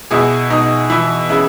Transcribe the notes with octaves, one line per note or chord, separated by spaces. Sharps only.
B2 E4 G#4
B2 D#4
E3 E4
C#3 E4